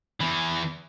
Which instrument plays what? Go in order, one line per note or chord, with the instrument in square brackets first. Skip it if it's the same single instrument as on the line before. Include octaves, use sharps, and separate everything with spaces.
[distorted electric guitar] E2 E3